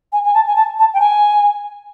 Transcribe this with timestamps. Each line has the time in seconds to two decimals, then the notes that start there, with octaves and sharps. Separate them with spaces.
0.12 G#5
0.24 G#5
0.34 A5
0.47 G#5
0.55 A5
0.79 A5
0.93 G5
1.00 G#5